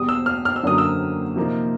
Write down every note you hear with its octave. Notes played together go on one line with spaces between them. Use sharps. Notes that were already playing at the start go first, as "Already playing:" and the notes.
Already playing: E2 B2 G3 D#6
E6
F6
F6
E6
F#2 D3 F#3 A#3 D4 D#6
E6
C3 F3 A#3 D#4